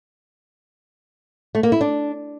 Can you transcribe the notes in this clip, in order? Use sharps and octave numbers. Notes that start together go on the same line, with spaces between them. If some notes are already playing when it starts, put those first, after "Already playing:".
A3
A#3
E4
D4